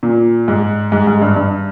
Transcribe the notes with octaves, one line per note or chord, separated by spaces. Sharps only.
A#2
G#2
G#2
G#2
G2
G2